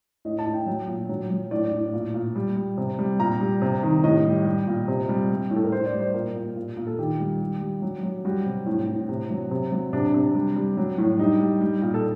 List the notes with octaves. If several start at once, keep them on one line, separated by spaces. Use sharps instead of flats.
A2 D#5
A5
A2
G5
F#3
A#2
F#3
F#3
A2 D5
A2
A#2
A#2
G3
G3
C3
G3
A#2 A#5
G3
C3
D#3
A2 D#5
G3
G3
A#2
C3
G3
G3
A2
A4
A#4
A2 C5
D5
G3
C5
A#2 A#4
A#2
A#2
A#2
A4
D#3 G4
G3
G3
G3
F#3
F#3
G3 F#4
C3
A2
A2
C3
F#3
C3
F#3
C3 D4
C3
G3
G3
F#3
A2
G3 D#4
G3
G3
A#2
A4